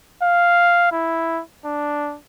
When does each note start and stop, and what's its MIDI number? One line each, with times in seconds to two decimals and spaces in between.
0.23 0.89 77
0.92 1.41 64
1.65 2.17 62